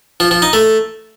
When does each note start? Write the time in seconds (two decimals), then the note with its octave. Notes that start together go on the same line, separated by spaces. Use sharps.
0.20 F3
0.31 F3
0.42 D#4
0.53 A3